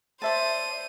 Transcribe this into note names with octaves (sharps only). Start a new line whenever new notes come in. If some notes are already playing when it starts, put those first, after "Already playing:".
C5 D5 E5 A5 D#7